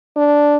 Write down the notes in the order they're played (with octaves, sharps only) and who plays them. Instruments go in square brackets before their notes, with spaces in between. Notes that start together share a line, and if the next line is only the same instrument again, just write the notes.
[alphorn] D4